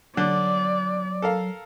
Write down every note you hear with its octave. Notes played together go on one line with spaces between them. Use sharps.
D3 F#3 D5
A4 A#4 F5